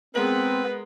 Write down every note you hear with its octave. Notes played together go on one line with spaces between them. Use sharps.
G#3 B3 C4 A#4 B4 F#7